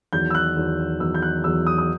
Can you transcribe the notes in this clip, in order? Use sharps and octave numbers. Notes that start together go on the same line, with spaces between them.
E2 D#3 F#3 G6
E6
F#6
E2 D#3 F#3
E2 D#3 F#3 E6
G6
F#6
E2 D#3 F#3 E6
D#6
D#6